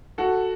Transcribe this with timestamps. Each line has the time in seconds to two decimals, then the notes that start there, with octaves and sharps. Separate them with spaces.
0.18 F#4 A4